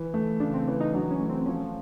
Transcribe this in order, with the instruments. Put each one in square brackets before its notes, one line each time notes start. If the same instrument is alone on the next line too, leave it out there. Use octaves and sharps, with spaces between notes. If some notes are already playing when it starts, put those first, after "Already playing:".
Already playing: [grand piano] E3
A3
[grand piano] C#3 [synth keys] D4
[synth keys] C4
[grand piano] E3 [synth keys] C#4
[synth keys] D#4
[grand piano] F#3 [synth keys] D4
[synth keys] C#4
[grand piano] A3
[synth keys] C4
[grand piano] F3 [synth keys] C#4